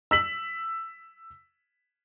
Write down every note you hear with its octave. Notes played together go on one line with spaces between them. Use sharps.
E6 B6 F#7